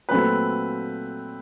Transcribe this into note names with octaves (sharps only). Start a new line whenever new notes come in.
A#2 F#3 A3 C4 B4